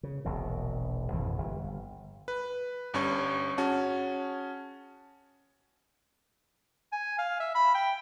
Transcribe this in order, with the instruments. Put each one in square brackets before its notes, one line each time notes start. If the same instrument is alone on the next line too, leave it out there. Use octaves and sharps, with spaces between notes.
[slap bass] C#3
E1 A#1 B2
G#1 F2 B2 E3
G1
[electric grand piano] B4
G1 G2 C#4 C#6
C#4 F#4 G#4 A5
[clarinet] G#5
F5
E5
B5
G5